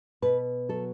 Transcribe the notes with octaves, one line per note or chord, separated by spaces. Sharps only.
B2 B4
F#3 A4